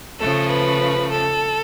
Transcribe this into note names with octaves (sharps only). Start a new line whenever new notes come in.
C#3 F3 A3 A4
B4
A4